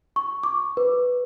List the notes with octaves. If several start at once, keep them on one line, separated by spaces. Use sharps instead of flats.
C#6
D6
B4